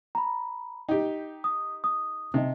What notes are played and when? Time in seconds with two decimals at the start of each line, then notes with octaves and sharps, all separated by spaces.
0.15 A#5 B5
0.89 D#4 G4 G5
1.44 D#6
1.84 D#6
2.34 C3 D#4 D#5